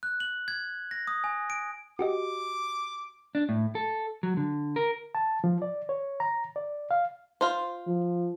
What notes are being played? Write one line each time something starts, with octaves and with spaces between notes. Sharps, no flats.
F#6
F#7
G#6
A#6
D#6
G#5
D7
F#4 G4 D#5 D6
D4
A2
A4
F#3
D3
A#4
A5
F3
D5
C#5
A#5
D5
F5
F4 C5
F3